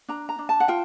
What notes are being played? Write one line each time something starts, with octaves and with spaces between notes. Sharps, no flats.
D4 A#5
A#5
D4
A5
F#5
F4 G5